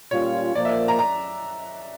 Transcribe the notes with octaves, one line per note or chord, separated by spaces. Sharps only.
A#2 G3 C#4 F4 C#5
A#2 F3 A#3 D5
E5
A#5
A#5